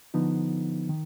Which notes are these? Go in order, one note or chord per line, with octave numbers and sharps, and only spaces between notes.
D3 F3 B3 D#4
D#3